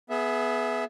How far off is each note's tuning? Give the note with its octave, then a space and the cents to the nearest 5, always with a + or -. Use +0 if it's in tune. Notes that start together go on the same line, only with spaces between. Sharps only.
B3 +0 G#4 +25 E5 +0